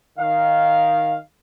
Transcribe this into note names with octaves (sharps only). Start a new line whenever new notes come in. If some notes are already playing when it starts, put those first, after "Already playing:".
D#3 F5